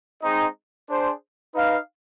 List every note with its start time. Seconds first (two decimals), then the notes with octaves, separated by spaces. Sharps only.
0.23 G#3 C4 D#4
0.89 D4 G#4 C5
1.54 D#4 B4 F5